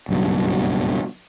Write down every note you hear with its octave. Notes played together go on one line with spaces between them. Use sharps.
F#1 B1 G2